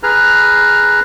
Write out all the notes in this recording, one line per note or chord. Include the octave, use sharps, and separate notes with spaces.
G#4 B4 A#5 F6